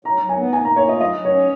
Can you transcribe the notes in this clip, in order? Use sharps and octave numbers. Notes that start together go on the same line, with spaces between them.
F#3 A#5
F#3
G#5
B3
A#3 G#5
A#5
A#3
C#5
F4 D#5
F#3 D#5
F#3
C#5
C#4